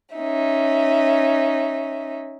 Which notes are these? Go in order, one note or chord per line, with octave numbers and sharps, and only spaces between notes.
C#4 D#4 E5